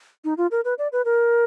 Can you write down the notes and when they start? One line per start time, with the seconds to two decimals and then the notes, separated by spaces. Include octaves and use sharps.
0.25 D#4
0.38 F4
0.51 A#4
0.65 B4
0.78 D5
0.92 B4
1.05 A#4